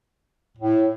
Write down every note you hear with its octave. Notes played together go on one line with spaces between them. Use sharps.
A2